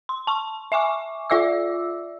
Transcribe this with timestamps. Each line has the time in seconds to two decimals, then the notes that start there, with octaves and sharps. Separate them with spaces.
0.09 C6
0.27 A5 C#6
0.72 E5 G#5 C#6 D6
1.30 F4 D5 E5 D6 E6